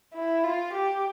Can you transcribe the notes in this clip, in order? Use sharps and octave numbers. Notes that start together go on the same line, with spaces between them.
E4
F4
G4